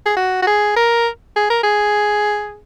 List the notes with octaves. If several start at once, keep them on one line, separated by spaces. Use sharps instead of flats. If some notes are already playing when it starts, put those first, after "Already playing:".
G#4
F#4
F#4
G#4
A#4
G#4
A#4
G#4